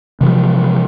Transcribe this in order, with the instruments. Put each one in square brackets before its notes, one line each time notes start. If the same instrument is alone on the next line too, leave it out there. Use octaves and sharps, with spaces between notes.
[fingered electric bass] C3 E3 F3